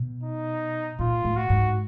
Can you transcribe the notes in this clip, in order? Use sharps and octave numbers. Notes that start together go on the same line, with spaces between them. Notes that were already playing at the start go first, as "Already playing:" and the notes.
Already playing: B2
D#4
A#2 F4
A2
F#4
G#2